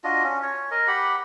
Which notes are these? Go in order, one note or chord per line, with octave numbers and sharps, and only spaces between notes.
D4 F4 F#4 D#5
C#4
C#5
A#4 D#5
G4 F#5 B5